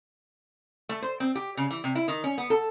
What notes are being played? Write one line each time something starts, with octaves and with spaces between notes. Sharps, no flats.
A3
C5
C4
G4
C#3
E3
C3
E4
D#3
C#4
B3
A4